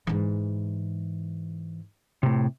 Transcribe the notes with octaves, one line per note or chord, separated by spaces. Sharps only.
G#2 E3
A2 C3